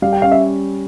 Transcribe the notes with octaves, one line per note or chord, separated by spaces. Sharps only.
G3 F5
G5
C#4 F5
E5